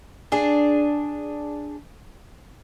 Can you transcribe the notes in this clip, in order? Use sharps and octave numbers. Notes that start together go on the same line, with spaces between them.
D4 G#4